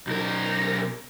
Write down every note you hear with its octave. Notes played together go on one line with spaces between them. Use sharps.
B1 A#4